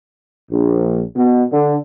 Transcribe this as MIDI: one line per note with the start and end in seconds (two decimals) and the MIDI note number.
0.50 1.00 34
1.16 1.43 47
1.51 1.75 50